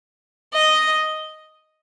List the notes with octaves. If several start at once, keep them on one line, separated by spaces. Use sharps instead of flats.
D#5